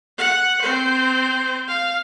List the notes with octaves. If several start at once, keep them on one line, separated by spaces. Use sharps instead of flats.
F#5
C4 C5
F5